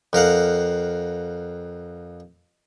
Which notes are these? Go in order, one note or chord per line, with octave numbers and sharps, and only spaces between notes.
F2 A#4 F5 F#5